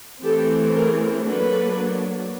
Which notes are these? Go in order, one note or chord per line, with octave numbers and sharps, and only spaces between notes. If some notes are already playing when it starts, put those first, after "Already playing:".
E3 A3 C4 G4 A4
G#4 A#4
F#3 A#3 D4 A4 B4